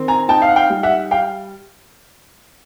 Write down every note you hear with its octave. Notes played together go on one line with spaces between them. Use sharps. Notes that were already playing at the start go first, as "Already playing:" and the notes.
Already playing: D#3 C4
G#5 A#5
D#4 G5 A5
F5
F#5
F5 G5
G3
E5 F#5
F5 G5